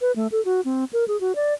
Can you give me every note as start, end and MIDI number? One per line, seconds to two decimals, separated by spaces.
0.01 0.12 71
0.16 0.27 57
0.32 0.43 69
0.45 0.61 66
0.65 0.85 60
0.93 1.05 70
1.08 1.19 68
1.20 1.35 66
1.35 1.54 74